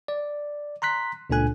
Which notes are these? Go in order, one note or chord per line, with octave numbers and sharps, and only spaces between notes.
D5
A#5 C6 F#6 B6
C#2 A#2 D4 A4 G#5 F#6